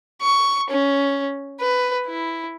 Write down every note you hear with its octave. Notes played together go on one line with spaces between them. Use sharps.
C#6
C#4
B4
E4